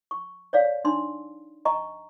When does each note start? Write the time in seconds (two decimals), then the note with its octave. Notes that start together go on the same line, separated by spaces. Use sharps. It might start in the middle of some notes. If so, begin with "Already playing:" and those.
0.11 C#6
0.53 C#5 D5 F5
0.85 D4 D#4 C6
1.65 D#5 G#5 A#5 C#6